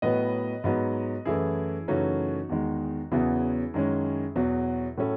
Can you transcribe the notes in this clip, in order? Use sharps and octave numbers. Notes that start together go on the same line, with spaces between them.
A2 F#3 B3 B4 D#5
G#2 F#3 B3
F#2 E3 A3 E4 G#4
F#2 C#3 E3 A3 C#4 D#4 F#4
E2 D#3 G#3
E2 C#3 F#3 B3 E4 G#4
F#2 D#3 G#3 C#4
E2 B2 F#3
A2 F#3 A3 C#4